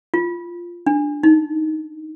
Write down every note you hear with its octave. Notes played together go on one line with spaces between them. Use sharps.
F4
D4
D#4